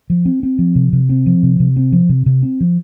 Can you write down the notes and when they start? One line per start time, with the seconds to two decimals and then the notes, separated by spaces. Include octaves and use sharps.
0.10 F3
0.25 C4
0.43 C4
0.59 F3
0.76 C3
0.93 C3
1.09 C4
1.26 F3
1.43 C3
1.60 C3
1.76 C4
1.92 F3
2.09 C3
2.26 C3
2.43 C4
2.61 F3